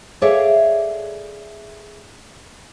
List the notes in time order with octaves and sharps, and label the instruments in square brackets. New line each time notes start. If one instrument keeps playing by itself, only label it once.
[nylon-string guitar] G#4 A4 C#5 D5 E5 F5